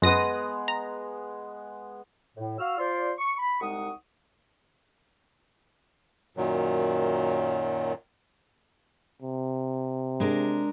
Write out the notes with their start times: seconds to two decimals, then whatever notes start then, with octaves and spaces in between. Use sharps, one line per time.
0.02 F#2 G#3 B3 A#6 D#7
0.68 A#5
2.36 A2
2.59 F#4 F5 E6 F6
2.78 F4 C5 D5 C6
3.18 C#6
3.38 B5
3.60 C2 G#3 D#4 F#5 C#6 D#6
6.37 F#2 A#2 D#3 F#3
9.22 C3
10.20 G#3 D4 A#4